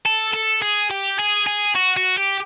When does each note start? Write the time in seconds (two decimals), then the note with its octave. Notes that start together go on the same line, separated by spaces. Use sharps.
0.06 A4
0.34 A4
0.62 G#4
0.91 G4
1.19 G#4
1.47 G#4
1.75 F#4
1.97 F#4
2.17 G4